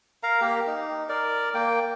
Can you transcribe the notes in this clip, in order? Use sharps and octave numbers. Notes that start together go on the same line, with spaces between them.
A#4 F5 A#5
A#3 G4
D#4
A#4 D5
A#3 G5